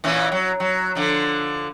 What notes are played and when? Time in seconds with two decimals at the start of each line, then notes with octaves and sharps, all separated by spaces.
0.04 A#2 E3 C#4
0.32 F#3
0.60 F#3
0.95 D3 F3